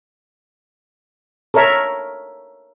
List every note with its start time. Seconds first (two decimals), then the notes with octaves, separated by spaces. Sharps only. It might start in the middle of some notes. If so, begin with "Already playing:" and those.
1.54 A4 A#4 C#5 E5